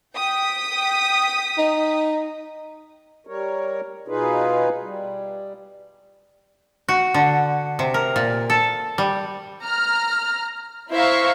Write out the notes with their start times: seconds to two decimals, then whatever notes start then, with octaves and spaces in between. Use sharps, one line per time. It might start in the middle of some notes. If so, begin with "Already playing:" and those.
0.15 G5 D#6 B6
1.58 D#4
3.27 G3 A#4 C#5
4.08 B2 D#4 F4 G#4 B4
4.83 G3
6.89 F#4
7.14 D3
7.79 C3
7.94 A#4
8.16 A#2
8.50 A4
8.98 G3
9.62 A#5 F6
10.90 E4 C5 E5 F5 A#5 C#6